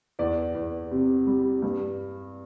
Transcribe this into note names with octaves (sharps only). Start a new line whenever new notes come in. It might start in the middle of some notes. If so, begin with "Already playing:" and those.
E2 D5
E2
C3
G3
G2